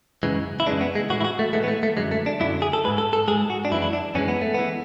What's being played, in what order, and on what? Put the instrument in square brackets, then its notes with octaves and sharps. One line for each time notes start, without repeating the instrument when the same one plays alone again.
[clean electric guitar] F#2 C#3 E3 G#3
E4
F#2 C#3 E3 G#3 D4
B3
G#3
A2 E3 G#3 F#4
E4
F#4
A3
A2 E3 G#3 A3
B3
A3
A3
F#2 D3 F#3 G#3
A3
D4
F#2 D3 F#3 E4
G#4
A4
G#3 B4
G#2
A4
A4
G#3 G#4
G#2
F#4
D4
F#2 E3 G#3 E4
E4
D4
F#2 E3 G#3 C#4
B3
A3
E3 G#3 B3